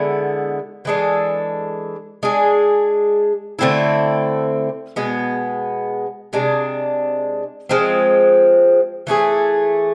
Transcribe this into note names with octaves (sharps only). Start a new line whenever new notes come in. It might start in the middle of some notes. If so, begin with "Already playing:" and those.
Already playing: D3 G#3 B3 E4
E3 G#3 D4 A4
G#3 D4 G#4
D3 A3 C4 E4
B2 G#3 B3
C3 G#3 D4
F3 G#3 C4
E3 A3 D4 G#4